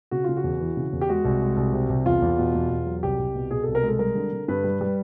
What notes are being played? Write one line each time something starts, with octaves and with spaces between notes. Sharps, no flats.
C#3 F#4
C#3 F4
F#4
E2
E3
C#3
E2
G4
G#3 F#4
C2
G#3
C2
C3
C2
E2 F4
E2
B2
E2
E2
F#3
C2 G4
C2
B2
B2 G#4
C2 A4
A#4
G#3 A4
G3 A#4
D3
D3
G2 B4
G3
G3